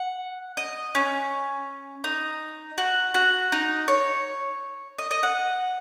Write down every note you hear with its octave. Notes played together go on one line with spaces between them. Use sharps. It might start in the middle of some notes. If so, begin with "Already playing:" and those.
Already playing: F#5
D#5
C#4
D#4
F#4
F#4
D#4
C#5
D#5
D#5
F#5